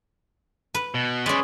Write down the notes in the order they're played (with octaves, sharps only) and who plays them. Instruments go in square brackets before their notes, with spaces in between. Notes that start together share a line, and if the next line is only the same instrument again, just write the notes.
[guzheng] B4
[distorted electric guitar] B2
[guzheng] G#3 C#4 [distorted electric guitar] B4 D5